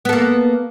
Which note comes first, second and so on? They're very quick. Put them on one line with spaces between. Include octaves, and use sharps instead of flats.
B3 A4 A#3